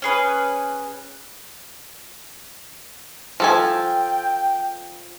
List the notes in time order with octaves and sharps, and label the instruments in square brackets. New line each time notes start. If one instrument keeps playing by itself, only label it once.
[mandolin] C#4 G#4 B4
[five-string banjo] F3 A4 G#5 [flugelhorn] G5